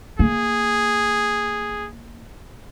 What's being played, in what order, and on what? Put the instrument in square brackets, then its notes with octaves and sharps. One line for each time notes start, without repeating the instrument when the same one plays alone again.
[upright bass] A#3 [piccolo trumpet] G#4